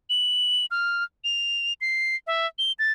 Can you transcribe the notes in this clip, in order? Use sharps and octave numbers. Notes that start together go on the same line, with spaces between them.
F#7
F6
F7
C7
E5
G7
A6